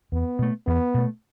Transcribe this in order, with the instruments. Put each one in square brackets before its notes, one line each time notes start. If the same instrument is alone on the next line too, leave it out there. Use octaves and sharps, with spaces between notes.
[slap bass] E2 [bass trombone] B3
[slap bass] B2 A3
[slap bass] E2 [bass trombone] B3
[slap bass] B2 A3